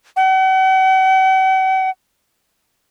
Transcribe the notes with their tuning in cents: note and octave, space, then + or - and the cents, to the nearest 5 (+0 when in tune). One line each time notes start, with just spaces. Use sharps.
F#5 +45